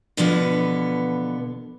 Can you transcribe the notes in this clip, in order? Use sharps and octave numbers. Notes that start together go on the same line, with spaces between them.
B2 D3 E3 F3 B3